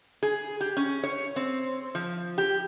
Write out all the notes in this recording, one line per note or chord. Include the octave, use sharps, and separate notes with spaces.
G#4
G4
C#4
C#5
C4
F3
G4